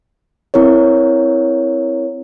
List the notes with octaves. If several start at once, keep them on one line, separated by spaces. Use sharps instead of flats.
C4 E4 A#4 C#5